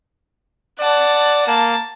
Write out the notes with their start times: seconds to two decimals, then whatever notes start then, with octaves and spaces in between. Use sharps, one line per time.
0.80 D5 F#5 A5
1.47 A#3 A5